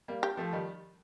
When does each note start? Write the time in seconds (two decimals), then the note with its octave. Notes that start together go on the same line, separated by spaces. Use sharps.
0.08 G3 A#3
0.23 G4
0.37 F3 A3
0.53 D#3 G3